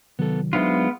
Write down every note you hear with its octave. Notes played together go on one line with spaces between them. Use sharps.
C3 D#3 F#3 B3 A4
F#3 G#3 B3 D4 D#4 F4 C5 E5